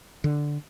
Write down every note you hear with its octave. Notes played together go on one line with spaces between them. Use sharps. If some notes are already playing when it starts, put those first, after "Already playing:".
D3